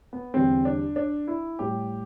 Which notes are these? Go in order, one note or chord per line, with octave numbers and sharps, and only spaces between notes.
B3
E2 D3 G3 C4
D4
D4
E4
A2 G3 G4